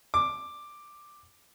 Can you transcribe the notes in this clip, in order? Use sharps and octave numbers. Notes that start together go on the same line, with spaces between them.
D6